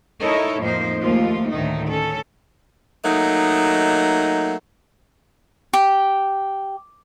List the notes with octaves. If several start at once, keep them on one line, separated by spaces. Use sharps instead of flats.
D#4 E4 A4 A#4 C#5 D#5
F2 A2 F3 A#3 D#4 C5
D#2 F3 A3 A#3 F4
D2 A2 D#3 A3 D#4
C#4 A4
F#3 A3 A#3 D#4
G4